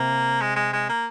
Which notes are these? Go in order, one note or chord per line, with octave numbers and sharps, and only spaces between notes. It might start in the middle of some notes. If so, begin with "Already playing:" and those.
Already playing: C3 A#3
G#3
G#3
G#3
A#3